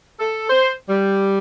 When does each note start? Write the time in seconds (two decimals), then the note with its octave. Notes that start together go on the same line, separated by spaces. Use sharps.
0.20 A4
0.50 C5
0.89 G3